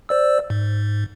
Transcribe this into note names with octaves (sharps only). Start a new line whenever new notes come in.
C5 D5 E6
G#2